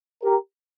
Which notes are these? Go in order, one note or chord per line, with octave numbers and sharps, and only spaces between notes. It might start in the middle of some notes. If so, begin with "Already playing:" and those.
G4 A#4